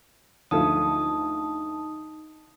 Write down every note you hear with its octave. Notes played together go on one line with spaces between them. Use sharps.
D2 F3 A3 D#4 A5 D#6